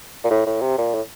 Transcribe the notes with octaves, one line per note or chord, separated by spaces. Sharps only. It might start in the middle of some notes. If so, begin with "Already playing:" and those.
A#2
A2
A2
C3
A#2
A2